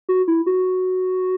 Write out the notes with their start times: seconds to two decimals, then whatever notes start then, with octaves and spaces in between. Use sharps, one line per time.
0.09 F#4
0.28 E4
0.46 F#4